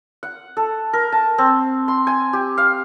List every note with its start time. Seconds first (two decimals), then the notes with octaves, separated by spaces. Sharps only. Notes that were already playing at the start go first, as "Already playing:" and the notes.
0.23 F#5
0.57 A4
0.93 A#4
1.12 A5
1.38 C4
1.88 C6
2.07 G#5
2.33 G4
2.58 F5